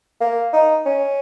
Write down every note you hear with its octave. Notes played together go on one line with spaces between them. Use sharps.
A#3
D#4
C#4